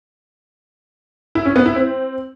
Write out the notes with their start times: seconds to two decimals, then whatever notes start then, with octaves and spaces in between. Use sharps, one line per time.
1.35 E4
1.45 C#4
1.56 B3
1.66 E4
1.76 C4